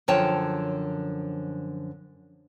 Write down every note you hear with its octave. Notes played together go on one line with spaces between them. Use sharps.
F#2 D3 F3 C#5 G5 A5